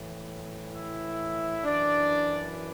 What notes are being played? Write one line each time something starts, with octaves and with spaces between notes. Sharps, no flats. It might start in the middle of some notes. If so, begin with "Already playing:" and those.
Already playing: A2 E3
E4 E5
F#2 E3 D4 D5